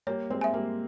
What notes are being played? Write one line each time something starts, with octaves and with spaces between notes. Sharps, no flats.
G3 A#3 C#5
G#3 C4
E5 G#5
G3 A#3